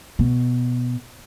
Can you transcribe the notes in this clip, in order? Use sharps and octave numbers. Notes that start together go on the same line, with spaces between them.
B2